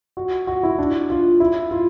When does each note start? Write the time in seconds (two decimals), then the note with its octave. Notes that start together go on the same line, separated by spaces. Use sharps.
0.17 F#4
0.47 F#4
0.63 E4
0.79 D4
1.10 F4
1.40 E4
1.71 F4